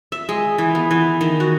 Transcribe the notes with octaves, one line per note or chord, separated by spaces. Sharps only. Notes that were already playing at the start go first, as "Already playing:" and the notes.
E5
G#3
E3
B3
E3
D#3
F#4